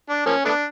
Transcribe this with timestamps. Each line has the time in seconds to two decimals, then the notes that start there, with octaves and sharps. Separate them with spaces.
0.09 D4
0.26 F3 A#3 C#4
0.45 A3 B3 D4